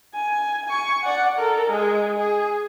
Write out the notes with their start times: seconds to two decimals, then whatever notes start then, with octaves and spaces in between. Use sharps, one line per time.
0.15 G#5
0.66 G#5 C#6
1.03 D5 F#5
1.39 A4 A#4
1.71 G#3 G#4
2.17 G#4